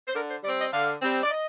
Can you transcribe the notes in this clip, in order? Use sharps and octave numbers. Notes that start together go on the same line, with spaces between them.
C5
D3 A#4
C5
G3 C4 D5
D#5
D3 F5
G3 C4
D5
D#5